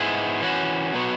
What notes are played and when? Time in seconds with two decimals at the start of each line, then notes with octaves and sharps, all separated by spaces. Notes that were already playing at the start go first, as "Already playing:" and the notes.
Already playing: G#2 G#3 B3 E4 G#4
0.41 E3 C#4 F#4
0.93 B2 F#3 B3 F#4